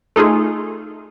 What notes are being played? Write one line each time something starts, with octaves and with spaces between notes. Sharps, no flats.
A3 D#4 F4 G#4